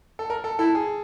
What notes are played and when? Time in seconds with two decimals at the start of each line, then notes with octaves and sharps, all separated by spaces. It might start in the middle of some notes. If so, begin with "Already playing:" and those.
0.19 A4
0.30 A#4
0.44 A4
0.59 E4 A4
0.75 G#4